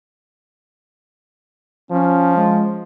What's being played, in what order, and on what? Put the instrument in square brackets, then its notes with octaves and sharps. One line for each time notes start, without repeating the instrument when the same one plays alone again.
[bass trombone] F3 [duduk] C#4
[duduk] G#3